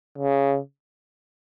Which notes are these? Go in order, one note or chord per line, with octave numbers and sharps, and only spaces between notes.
C#3